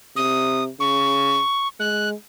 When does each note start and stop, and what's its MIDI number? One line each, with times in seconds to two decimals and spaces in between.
0.16 0.70 48
0.16 0.64 87
0.80 1.40 49
0.80 1.68 85
1.80 2.14 56
1.80 2.09 90